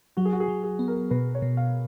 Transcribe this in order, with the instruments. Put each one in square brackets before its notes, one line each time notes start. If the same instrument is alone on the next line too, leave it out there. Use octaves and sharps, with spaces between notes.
[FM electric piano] F#3 [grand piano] F#4
[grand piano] G#4
F#4
G#4
[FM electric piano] F#3
[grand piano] G#4
[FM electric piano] B3
[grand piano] A#4
[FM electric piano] B2 [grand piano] B4
[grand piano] C#5
[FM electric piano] B2
[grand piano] F5